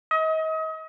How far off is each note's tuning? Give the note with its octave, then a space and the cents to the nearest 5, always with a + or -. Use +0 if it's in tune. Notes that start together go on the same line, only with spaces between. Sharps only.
D#5 +35